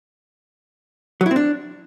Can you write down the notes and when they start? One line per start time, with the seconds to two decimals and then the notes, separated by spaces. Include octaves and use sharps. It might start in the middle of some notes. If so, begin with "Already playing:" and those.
1.21 F#3
1.26 E4
1.31 C4
1.36 D4